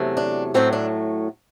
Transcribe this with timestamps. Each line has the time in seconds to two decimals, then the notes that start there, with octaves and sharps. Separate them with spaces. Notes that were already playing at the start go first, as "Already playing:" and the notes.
Already playing: E2 C3 F#3 A3
0.17 D4
0.54 A2 F#3 A3 C4
0.73 D4